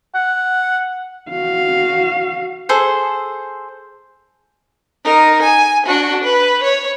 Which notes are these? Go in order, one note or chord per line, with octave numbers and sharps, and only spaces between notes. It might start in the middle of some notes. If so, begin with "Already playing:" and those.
F#5
F#4 F5
G#4 A4 C5
D#4 A#4
G#5
D4 F#4
B4
C#5